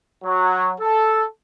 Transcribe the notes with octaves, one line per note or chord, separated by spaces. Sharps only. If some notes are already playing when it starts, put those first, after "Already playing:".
F#3
A4